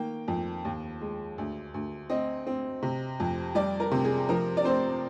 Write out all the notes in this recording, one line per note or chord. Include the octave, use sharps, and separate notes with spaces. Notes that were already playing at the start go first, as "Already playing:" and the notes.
Already playing: D#3 A#3 G5
F2
D#2
G#3
D2
D2
C4 D#5
C4
C3
F2
G3 D5
A#4
C3
G#4
F3 A#4
D5
C4 C5